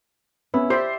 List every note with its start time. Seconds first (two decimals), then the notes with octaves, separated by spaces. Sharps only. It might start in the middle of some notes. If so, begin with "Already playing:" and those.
0.54 B3 C#4 E4
0.70 G4 C5 D5 E5